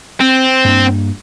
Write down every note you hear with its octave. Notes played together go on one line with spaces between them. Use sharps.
C4
G2 A#3